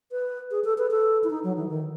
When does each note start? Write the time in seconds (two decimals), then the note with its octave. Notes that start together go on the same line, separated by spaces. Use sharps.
0.12 B4
0.51 G#4
0.64 A4
0.78 B4
0.91 A4
1.24 E4
1.30 D#4
1.44 F#3
1.57 E3
1.69 D#3